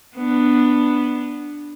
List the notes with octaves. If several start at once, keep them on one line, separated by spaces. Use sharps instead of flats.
B3 D4